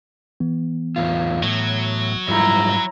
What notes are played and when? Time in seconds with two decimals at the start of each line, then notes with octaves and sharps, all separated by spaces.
0.40 E3 B3
0.96 E2 A2 F4
1.43 A2 F#3
2.28 G#2 F3 G3 E4 A#5